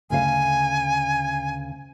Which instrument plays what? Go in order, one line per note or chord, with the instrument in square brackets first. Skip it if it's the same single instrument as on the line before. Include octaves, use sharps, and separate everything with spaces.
[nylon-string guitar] D2 C#3 F5 [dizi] G#5